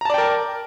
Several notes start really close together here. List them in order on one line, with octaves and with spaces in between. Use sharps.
A#5 A5 D5 G5 A#4